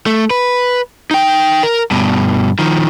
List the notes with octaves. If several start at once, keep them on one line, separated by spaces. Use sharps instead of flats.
A3
B4
D#4 G5
A#4
G2 B2
D#3 F3